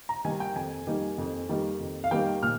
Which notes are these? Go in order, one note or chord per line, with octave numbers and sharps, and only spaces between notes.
A#5
D#3 G3 A#3 D#4 G#5
G5
F2 G#5
D#3 G3 A#3 D#4
F2
D#3 G3 A#3 D#4
F2
F5
D#3 G3 A#3 D#4 G5
A#2 F6